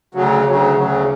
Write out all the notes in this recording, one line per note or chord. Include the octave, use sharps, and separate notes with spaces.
D2 C#3 F#3
D2 C#3 F#3
D2 C#3 F#3